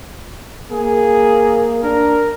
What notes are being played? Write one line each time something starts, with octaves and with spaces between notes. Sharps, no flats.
A#3 G#4
D4 A#4